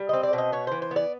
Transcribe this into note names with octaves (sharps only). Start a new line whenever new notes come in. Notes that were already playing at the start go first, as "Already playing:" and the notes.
Already playing: G3
C4 D#5
D5
B2
D#5
B3 C#5
E3 C5
C5
B3
D5